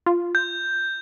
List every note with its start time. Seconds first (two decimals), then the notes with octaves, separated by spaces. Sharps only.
0.06 F4
0.35 G6